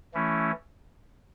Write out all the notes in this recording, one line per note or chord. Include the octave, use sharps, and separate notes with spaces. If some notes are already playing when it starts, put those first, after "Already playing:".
E3 A3 C#4 E4